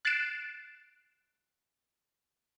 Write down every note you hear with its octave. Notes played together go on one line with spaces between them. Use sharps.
F#6 A6 C7 D7 E7